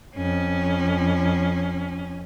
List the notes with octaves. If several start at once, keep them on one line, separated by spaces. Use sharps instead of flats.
F2 C#4